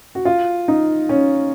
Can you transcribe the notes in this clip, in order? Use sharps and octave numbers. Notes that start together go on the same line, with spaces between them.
F#4
F4
D#4
C#4